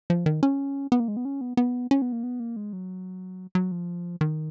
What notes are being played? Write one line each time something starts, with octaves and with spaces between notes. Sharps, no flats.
F3
D#3
C#4
B3
A#3
G#3
B3
C#4
B3
B3
C#4
B3
A#3
B3
A#3
G#3
F#3
F#3
F3
D#3